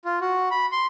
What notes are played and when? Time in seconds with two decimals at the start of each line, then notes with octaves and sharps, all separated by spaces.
0.05 F4
0.21 F#4
0.51 B5
0.72 C6